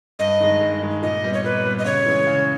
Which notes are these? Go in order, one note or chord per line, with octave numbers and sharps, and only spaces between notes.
G2 D#5
D#3 G#3
G2
D#3 G#3
A#2 D#5
G3 B3
C#5
A#2 B4
G3 B3
D#5
C#3 C#5
E3 G#3
C#3